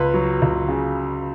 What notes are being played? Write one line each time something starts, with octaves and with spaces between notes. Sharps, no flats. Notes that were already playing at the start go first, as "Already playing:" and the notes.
Already playing: C#2 B4
F#3
C#2
C#3